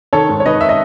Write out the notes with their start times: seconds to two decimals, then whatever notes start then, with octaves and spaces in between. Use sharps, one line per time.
0.13 D#3 A4 C#5
0.29 G#2
0.40 C#5
0.45 D#3 B4 D#5
0.61 E5
0.69 D#5